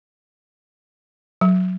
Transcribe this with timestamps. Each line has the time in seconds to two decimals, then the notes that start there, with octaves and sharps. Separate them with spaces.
1.41 F#3